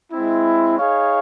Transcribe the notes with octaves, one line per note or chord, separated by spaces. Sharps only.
G#3 C4 E4
D#4 G#4 C#5 F5